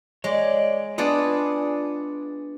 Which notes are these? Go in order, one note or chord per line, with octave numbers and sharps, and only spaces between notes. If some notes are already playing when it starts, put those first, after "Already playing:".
G#3 C#5 D5
B3 D4 F4 G#4 D5